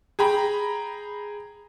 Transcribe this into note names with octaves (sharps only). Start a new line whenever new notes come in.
G#4 G5 A#5 B5